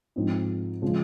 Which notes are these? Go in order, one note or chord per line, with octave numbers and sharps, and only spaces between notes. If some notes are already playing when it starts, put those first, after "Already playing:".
G#2 F3 G#3 C4 D#4
C#3 F3 G#3